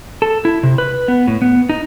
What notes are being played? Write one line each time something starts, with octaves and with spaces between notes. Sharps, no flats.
A4
E4
C3
B4
B3
A2
B3
D#4